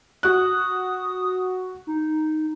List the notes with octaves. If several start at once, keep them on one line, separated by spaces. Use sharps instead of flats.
F#4 D#6 F#6
D#4